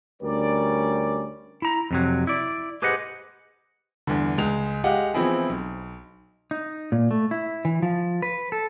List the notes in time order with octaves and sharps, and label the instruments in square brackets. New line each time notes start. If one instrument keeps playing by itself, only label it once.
[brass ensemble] D2 G3 C#4 A#4 D5
[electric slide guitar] E4 A#5
F2 C3 F#3
E4 D5
G4 G#4 B4 C5 D#5 F#5
[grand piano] E2 G2 D3
C#2 G#3 F7
G#3 G4 D#5 F5 F#5
E3 F3 B3 C4 E4 G#4
B1
[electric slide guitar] D#4
A#2
A3
E4
E3
F3
B4
A4